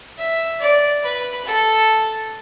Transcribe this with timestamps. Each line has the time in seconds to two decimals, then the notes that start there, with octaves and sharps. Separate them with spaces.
0.18 E5
0.60 D5
1.04 B4
1.45 A4